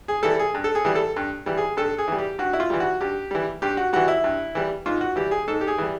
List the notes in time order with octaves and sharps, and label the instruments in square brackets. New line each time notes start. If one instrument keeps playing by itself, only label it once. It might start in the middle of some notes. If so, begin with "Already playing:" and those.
[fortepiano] G#4
E3 G3 A4
G#4
G2
A4
G#4
E3 G3
A4
G2
E3 G3
G#4
G2 A4
G#4
E3 G3
G4
G2 F#4
E4
F4
E3 G3
F#4
G2 G4
E3 G3
G2 G4
F#4
E3 G3 F#4
E4
G2
E3 G3
G#2 F4
F#4
E3 G3 G4
G#4
G#2 A4
G4
G#4
E3 G3